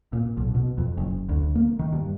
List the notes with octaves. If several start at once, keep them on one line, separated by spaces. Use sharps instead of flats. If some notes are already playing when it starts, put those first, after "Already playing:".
A#2
B1
B2
F2
F#1
D2
A#3
D#3
G2